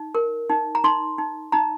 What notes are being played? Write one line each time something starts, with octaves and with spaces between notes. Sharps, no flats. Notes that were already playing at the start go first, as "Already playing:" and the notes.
Already playing: D#4
A#4
D#4
A#5
D#4 C6
D#4
D#4 A#5